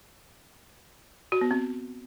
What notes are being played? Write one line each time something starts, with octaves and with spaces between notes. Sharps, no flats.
F#4
B3
C4